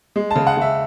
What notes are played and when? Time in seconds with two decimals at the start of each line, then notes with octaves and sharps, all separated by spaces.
0.16 G#3
0.31 C#3 A5
0.47 F#5
0.57 C#3 E5